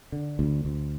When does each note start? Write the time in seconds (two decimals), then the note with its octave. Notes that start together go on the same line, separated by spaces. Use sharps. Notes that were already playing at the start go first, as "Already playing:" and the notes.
0.12 D3
0.39 D2
0.65 D2